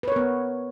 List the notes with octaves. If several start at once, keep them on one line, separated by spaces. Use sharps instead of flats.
B3 A#4 B4 C#5